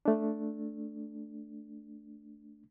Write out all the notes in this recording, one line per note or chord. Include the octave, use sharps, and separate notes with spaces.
A3 D4